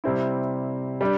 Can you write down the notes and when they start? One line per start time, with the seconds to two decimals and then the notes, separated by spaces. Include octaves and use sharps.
0.04 C3 G3 C4 E4
1.01 G3 D4